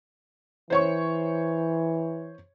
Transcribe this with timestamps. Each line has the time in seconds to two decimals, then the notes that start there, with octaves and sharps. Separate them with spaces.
0.70 E3 C5 C#5 C#6